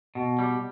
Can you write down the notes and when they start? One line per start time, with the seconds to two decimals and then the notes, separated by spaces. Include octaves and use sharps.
0.15 B2
0.39 G3